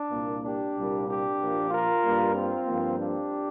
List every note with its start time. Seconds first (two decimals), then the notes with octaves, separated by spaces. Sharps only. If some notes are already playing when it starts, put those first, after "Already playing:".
Already playing: D4
0.11 C2 A#2 A#3
0.44 D4 G4
0.76 C2 A#2 G3 A#3
1.07 D4 G4
1.39 A#1 A#2 F3 A#3
1.71 F4 A#4
2.04 G2 G3 A#3
2.35 C4 F4
2.67 G2 F3 A#3
2.98 D4 G4